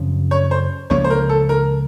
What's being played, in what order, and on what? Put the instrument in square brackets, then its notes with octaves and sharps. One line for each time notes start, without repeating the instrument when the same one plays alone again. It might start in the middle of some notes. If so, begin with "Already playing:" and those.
Already playing: [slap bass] F#2 C#3 F3 C4
[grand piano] C#5
C5
[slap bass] C#2 C#3 F3 A#3 [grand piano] C#5
[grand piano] C5
A#4
A4
A#4